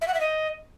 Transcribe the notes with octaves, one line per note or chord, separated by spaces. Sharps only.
E5
F#5
E5
D#5